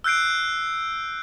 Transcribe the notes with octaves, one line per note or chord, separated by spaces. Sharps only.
E6 F#6 G6 C7 D7